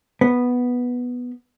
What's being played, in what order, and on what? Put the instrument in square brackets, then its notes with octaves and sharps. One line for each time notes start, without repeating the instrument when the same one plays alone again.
[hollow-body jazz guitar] B3